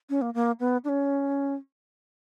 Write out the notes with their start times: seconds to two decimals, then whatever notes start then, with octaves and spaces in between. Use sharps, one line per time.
0.09 C#4
0.21 A#3
0.34 A#3
0.60 B3
0.84 D4
0.89 C#4